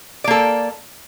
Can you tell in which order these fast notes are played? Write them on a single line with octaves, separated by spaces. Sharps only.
D5 A#3 A4